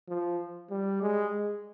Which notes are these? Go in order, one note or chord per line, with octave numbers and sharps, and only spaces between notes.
F3
G3
G#3